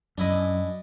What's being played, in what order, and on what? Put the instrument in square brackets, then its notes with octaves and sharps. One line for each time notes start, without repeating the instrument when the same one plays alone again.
[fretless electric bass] F#2 [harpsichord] D4 E4 D#5